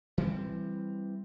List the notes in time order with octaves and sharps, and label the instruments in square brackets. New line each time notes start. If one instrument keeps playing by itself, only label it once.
[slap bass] E3 G3 C4